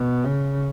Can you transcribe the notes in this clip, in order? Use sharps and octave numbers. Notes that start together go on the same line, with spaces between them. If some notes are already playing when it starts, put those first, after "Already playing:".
Already playing: B2
C#3